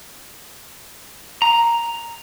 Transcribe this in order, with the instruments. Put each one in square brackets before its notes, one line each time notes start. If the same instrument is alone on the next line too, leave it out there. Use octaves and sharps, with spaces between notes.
[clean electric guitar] A#5